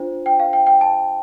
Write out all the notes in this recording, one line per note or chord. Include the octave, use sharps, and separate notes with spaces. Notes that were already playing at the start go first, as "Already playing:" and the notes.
Already playing: D4 F4 C5
G5
F5
G5
G5
A5